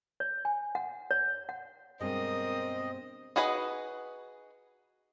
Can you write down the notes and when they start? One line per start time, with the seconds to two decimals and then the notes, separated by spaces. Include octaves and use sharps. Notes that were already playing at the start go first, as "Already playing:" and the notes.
0.20 C#5
0.45 G#5
0.75 F#5
1.11 C#5
1.49 F#5
2.00 G2 B2 G#3 C4 A#4 D#5 D#6
3.36 D#4 F#4 G#4 B4 D#5